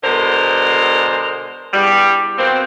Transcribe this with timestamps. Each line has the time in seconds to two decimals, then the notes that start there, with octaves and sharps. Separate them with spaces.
0.04 B2 D3 G#3 A#4 C5
1.74 E2 G2 G3
2.38 B2 A#3 C4